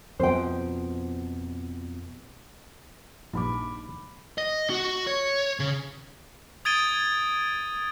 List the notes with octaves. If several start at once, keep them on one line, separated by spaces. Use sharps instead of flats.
F2 B2 F3 C5 G5
A#1 G2 D#4 A5 B5 D6
D#5
F#4
C#5
C#3
D#6 G#6 A6 D7 D#7 G7